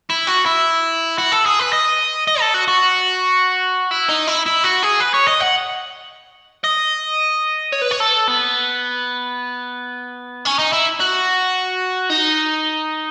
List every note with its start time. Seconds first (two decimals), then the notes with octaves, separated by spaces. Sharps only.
0.10 E4
0.27 F#4
0.46 E4
1.18 F#4
1.32 A4
1.46 G#4
1.59 B4
1.73 D#5
2.27 D#5
2.41 A4
2.54 F#4
2.68 F#4
3.91 E4
4.09 D#4
4.27 E4
4.46 E4
4.64 F#4
4.83 G#4
5.00 B4
5.14 C#5
5.27 D#5
5.40 F#5
6.64 D#5
7.72 C#5
7.82 B4
7.91 C#5
8.00 A4
8.28 B3
10.46 C#4
10.59 D#4
10.73 E4
11.00 F#4
12.10 D#4